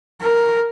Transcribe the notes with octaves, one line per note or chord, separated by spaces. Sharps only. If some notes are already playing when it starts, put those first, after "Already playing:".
A#4